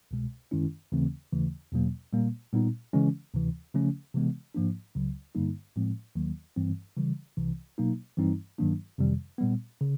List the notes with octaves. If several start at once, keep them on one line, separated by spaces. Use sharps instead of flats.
C2 B2 G#3
F#2 D#3 G#3 C#4 E4
D#2 C#3 E3 A3 C4
D#2 C#3 E3 A3
E2 B2 F#3 A#3
A#2 G3 A#3
A#2 G3 B3 D#4
C#3 E3 G#3 C#4
D2 C3 E3
C#3 F3 A3 C#4
C3 E3 G#3 B3
G#2 F3 A#3 D4
C#2 C#3 F#3
G2 D3 G3 A#3 D#4
A2 F3 G#3 C4
D#2 D#3 F#3 A#3
G2 E3 G3 C4
C#3 E3 G3
C2 C3 E3
B2 F#3 A#3 D#4
G2 E3 G3 C4 D#4
G2 D#3 F#3 A#3 D4
F2 C3 D#3 G3
A#2 G3 B3
C#3